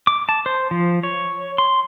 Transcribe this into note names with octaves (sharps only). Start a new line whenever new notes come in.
D6
A5
C5
F3
C#5
C6